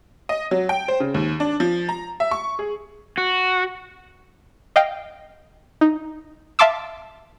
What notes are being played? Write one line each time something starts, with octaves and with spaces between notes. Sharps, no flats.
D#5
F#3
G5
C5
C#3
D#2
D4
F3
A#5
E5
C#6
G#4
F#4
D#5 F5 G5
D#4
E5 F5 A5 C6 D6 E6